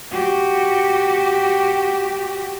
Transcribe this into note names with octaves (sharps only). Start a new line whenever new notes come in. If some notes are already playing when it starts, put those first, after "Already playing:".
F#4 G4